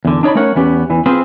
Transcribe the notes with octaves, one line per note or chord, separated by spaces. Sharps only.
E2 D3
D4 D#4 C#5 D5 B5
A3 C#4 A#4 C#5 F#5
E2 B3 C#4 G4
E2 E3
C4 F4 G#4 B4 C5